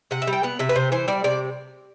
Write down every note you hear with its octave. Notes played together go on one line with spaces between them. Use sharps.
C3 F#5
E5
G3
G5
B3 F#5
C3 E5
B4
C3 C5
E3 C5
G3 D5
C3 D5